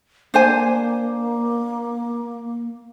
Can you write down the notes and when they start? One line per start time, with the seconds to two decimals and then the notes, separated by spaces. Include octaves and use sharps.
0.34 A#3 D4 C5 G#5